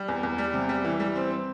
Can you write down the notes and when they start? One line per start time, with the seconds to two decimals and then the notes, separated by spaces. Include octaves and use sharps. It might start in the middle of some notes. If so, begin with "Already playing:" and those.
Already playing: G3
0.08 E2
0.23 E2
0.38 G3
0.54 C3
0.69 G3
0.84 E3
1.00 G3
1.16 C4
1.31 C4